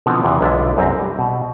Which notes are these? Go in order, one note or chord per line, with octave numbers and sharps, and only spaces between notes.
B2 D3 E3 F3 B3 C4
E2 C3 E3
B1 D3 G#3 F4 D5 E5
C2 F#2 C4 E5 A#5
G3
B2